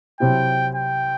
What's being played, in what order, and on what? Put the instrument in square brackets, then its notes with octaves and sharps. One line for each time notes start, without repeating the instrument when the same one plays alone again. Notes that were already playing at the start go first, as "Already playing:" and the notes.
[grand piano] C3 F#3 C4 E4 G4 [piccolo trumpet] G5
[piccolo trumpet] G5